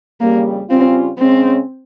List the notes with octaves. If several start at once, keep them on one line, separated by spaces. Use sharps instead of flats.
F2 C#3 G3 A#3
C#3 G3 C4 C#4 F4
C#3 G#3 C4 C#4